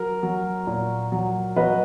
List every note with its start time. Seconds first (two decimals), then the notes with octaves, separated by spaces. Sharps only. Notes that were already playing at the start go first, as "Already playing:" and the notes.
Already playing: F#3 A#4
0.23 F#3
0.67 A#2
1.12 F#3
1.56 F#3 B4 D#5